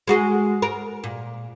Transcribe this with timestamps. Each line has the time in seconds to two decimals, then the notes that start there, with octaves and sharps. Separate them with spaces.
0.07 G#3 F#4 G#4
0.62 A#4
1.04 A#2